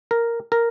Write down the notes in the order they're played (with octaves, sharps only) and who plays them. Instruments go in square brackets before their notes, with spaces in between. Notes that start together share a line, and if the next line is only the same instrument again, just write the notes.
[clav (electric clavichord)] A#4
A#4